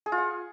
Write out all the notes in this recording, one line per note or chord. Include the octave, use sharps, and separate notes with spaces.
G#4
F4
F#5